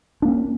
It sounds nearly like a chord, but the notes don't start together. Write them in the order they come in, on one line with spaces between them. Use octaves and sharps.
D4 A#3 C#4